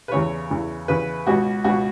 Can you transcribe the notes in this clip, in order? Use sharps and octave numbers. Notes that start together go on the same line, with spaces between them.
B4
E2 C#3 E3 C#5
E2 C#3 E3
E2 C#3 E3 B4
C#2 B2 F#4
C#2 B2 F#4